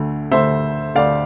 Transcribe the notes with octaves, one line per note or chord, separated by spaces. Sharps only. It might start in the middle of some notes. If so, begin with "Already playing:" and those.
Already playing: D2 D3 A3
D2 D3 A3 C5 E5
D2 D3 A3 D5 F5